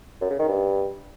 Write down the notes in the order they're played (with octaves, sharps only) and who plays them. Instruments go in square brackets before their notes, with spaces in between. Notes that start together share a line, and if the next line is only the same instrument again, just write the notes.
[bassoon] F#2
C#3
D#3
G2